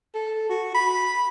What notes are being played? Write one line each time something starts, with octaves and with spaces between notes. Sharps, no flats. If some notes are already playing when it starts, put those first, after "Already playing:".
A4
F#4
B5